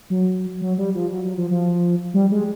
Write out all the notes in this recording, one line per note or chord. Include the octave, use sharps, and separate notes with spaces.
F#3
F#3
G3
F3
F#3
F#3
F3
F3
G3
G#3